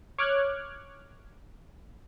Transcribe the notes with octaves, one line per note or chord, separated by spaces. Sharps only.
C#5 D6 F6 F#6 G#6